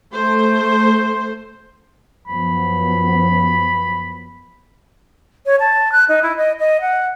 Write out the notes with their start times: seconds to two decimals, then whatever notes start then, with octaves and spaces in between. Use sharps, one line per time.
0.12 A3 C5
2.27 F#2 F3 B3 B5
5.46 C#5
5.60 A5
5.92 F#6
6.08 D#4
6.22 E4
6.37 D#5
6.59 D#5
6.81 F#5